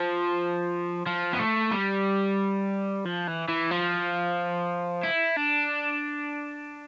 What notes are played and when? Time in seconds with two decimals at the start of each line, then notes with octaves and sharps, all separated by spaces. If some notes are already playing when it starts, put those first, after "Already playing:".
Already playing: F3
1.06 F3
1.33 B3
1.39 A3
1.72 G3
3.05 F3
3.27 E3
3.48 E3
3.71 F3
5.04 E4
5.37 D4